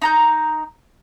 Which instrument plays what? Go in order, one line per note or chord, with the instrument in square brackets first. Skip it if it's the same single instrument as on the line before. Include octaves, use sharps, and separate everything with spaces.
[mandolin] D#4 A#5 G6